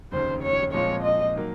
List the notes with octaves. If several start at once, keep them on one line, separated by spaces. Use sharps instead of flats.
F1 D#2 C#3 C5
C#5
A#2 F3 G#3 C4 F4 C#5
D#5
D#3 F#3 A#3